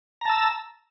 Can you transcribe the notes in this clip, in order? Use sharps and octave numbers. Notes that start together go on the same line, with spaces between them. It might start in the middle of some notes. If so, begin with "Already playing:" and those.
A5 A#5 E6